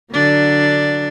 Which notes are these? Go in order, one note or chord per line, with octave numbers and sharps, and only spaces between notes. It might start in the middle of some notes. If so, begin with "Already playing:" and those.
D3 F#3 D4